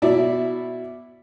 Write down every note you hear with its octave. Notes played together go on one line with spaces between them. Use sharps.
B2 E4 D5 E5